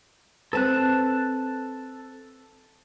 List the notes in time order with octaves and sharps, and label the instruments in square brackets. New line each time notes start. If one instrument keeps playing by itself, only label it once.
[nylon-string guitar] C4 B4 [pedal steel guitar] A4 A5 F#6